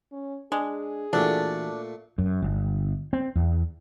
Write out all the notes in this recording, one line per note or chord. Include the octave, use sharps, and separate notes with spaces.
C#4
G#3 D4 G#4
A#2 E3 A3 D4 F#4 A4
F#2
G1
C4
E2